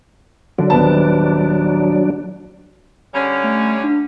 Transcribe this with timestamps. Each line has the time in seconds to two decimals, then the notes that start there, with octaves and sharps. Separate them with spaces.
0.58 D3 F#3 D4
0.70 D#1 B3 A5
3.14 D3 G3 C#4
3.44 A3
3.84 D4